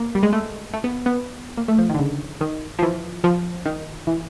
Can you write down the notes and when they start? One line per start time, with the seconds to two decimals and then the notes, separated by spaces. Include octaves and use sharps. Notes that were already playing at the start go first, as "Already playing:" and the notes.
Already playing: A#3
0.15 G3
0.23 G#3
0.33 A3
0.73 A3
0.84 B3
1.06 B3
1.57 A#3
1.68 A3
1.79 F3
1.89 D#3
1.94 D3
1.99 C#3
2.41 D#3
2.79 F3
2.83 E3
3.24 F3
3.66 D#3
4.07 E3